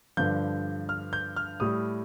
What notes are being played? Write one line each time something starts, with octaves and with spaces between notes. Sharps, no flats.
G2 D3 F3 G6
F6
G6
F6
A2 G3 D#6